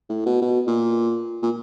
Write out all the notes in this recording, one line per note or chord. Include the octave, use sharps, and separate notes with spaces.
A2
B2
B2
A#2
A#2